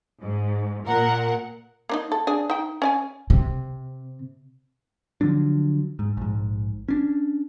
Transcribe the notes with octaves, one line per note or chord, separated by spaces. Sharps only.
G#2
A#2 A#4 F#5
A#3 D4 D#4
A4
D4 G#4
D#4 G5
C#4 D5 G#5
C3
D3 F3 F#3 D4
G#2
A#1 G#2
C#4 D4